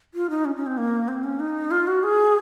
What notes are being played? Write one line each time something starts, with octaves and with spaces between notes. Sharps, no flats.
F4
D#4
C#4
C#4
C4
A#3
C4
C#4
D#4
F4
F#4
G#4